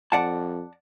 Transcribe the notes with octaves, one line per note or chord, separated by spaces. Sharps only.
F2 D5 F#5 A5